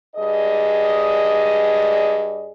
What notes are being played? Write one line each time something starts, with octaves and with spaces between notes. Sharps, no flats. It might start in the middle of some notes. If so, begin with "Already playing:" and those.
G2 G#4 D5 D#5